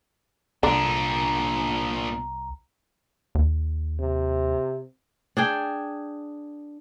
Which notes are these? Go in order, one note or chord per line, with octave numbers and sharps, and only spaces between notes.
C2 A#2 D3 D4 A#5
D#2
C3
D4 G#4 G5